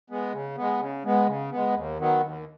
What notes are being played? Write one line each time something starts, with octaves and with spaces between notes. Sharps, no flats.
G#3 B3
C#3
G#3 B3
C#3
G#3 B3
C#3
G#3 B3
D#2
D#3 F#3 B3
D#2